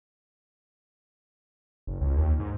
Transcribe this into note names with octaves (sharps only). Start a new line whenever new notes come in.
F#1
C#2
D#2
G#2